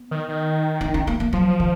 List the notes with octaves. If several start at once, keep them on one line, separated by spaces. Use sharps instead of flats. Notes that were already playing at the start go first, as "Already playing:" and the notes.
Already playing: B3
D#3
D#3
D#4
C#4
A#3
A#3
F3 F#3
D#3